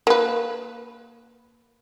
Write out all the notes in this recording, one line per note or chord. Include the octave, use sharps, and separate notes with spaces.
A#3 B4